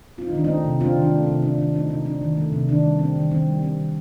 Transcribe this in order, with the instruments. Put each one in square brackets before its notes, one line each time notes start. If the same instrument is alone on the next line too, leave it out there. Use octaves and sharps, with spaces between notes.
[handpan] C4 F4
D#4
D#3 D4
C4 D#4
A3
C3
C4 D4 F4
D#3
D4
A3
C3 C4
C4 D4
D#3 D4
A3 C4 D#4
C3 C4 D#4
C4 D4
D#3
A3
C3
D#3 D4
G3
C4
D#3
D#3 C4
G3
C4
D#3